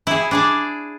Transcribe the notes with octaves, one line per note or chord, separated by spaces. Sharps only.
E4 G#4
D4 G#4 D5